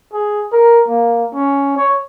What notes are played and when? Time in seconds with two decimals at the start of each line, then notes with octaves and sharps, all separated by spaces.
0.13 G#4
0.52 A#4
0.88 A#3
1.34 C#4
1.76 C#5